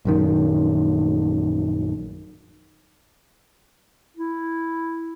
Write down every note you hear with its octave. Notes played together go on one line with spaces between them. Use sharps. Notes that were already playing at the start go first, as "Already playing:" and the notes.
A#1 F#2 D#3
E4